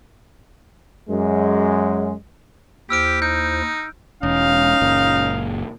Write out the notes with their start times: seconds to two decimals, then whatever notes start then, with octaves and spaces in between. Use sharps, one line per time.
1.09 F#2 G#3
2.90 D#2 E4 G4 C5 E6 F6 D7
3.22 D#4 G6
4.23 E1 C#4 D#4 F5
4.81 F#1 A#2